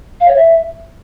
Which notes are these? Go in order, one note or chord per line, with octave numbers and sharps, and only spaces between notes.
F5
C#5
E5